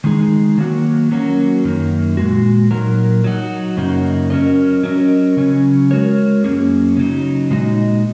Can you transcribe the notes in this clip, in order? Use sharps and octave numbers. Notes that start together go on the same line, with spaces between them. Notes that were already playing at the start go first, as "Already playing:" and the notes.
D#3 G#3 D#4 G#4
D#3 F#3 A#3 F#4
F#3 A#3 C#4 F#4
F#2 D#3 A#3
A#2 G#3 F#4
A#2 F#3 D#4 A#4
F#3 D#4 F#4
F#2 C#3 A#3 D#4 F#4
F#3 C#4 A#4 D#5
F#3 C#4 A#4 D#5
C#3 F#3 C#4
G#3 F#4 A#4 C#5
F#2 F#3 A#3 C#4 G#4
C#3 F#3 D#4
A#2 G#3 D#4 F#4 D#5